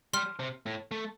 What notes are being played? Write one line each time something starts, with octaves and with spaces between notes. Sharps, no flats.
G3 C6 F6
C3
A2
A3